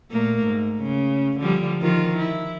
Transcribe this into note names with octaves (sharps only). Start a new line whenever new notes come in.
A#2 A3 A#3
G#2
C#3
D3 F3 G3
D#3 F3 F4
E4